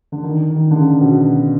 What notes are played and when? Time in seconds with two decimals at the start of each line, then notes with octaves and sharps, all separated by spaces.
0.12 D3
0.23 D#3
0.50 D#3
0.71 D3
0.75 C#3
1.01 B2